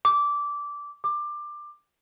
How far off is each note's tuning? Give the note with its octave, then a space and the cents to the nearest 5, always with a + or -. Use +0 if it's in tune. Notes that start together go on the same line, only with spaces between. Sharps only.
D6 -15
D6 +15